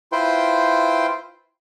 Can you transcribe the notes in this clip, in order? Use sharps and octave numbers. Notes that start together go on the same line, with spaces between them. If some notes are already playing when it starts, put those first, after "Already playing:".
E4 F4 B4 C5 G5 C6